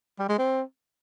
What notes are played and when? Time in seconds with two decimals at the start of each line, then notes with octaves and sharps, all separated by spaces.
0.19 G3
0.29 G#3
0.39 C4